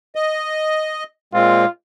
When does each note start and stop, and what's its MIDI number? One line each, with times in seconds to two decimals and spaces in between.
0.15 1.04 75
1.34 1.65 46
1.34 1.65 56
1.34 1.65 60
1.34 1.67 65